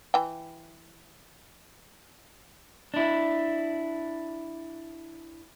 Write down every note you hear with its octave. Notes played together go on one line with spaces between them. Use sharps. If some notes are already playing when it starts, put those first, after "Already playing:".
E3 G5
D4 E4